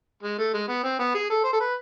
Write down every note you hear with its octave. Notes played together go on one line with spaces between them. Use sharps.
G#3
A3
G#3
B3
C4
B3
G#4
A4
C5
A4
B4